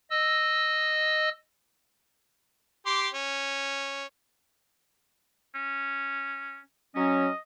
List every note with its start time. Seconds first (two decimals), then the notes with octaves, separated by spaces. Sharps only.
0.10 D#5 E6
2.86 G4 C6 D6
3.14 C#4
5.55 C#4
6.96 F#3 C#4 D#5